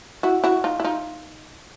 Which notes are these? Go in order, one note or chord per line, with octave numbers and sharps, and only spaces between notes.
E4 F#4
E4 F#4
D#4 F4
E4
D#4 F4